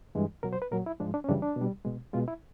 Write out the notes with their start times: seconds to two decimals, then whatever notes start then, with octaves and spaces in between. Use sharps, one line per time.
0.15 G2 E3 G#3
0.43 B2 F#3 A#4
0.53 C5
0.62 B4
0.71 A#2 F#3 A#4
0.86 E4
1.00 G#2 F3 G#3 D4
1.14 D4
1.24 C#4
1.28 F#2 C#3 E3 G3 D4
1.42 D4
1.56 B2 G3
1.85 B2 G#3
2.13 B2 G#3 F4
2.28 E4